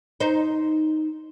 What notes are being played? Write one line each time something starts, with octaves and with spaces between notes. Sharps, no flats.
D#4 C5